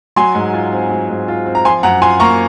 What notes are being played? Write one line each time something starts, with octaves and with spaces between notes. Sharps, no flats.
F#3 G#5 C6
G#2
F4
C4
F#3
G#2
F4
C4
A#5
F3 G#5 C6
F#2 F#5 A#5
F4 G#5 C6
A#3 A#5 C#6